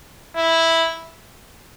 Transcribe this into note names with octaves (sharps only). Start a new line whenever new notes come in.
E4